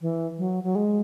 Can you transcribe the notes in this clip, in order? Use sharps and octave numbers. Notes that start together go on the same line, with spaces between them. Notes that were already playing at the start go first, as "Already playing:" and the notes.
E3
F#3
F#3
G#3